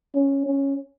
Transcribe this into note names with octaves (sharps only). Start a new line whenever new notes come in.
C#4
C#4